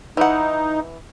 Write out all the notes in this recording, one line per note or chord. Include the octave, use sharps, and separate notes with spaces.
E3 D#4 F#5